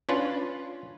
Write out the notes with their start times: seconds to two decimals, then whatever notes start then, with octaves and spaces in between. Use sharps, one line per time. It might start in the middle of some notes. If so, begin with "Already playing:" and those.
0.09 C#4 D4 F4 B4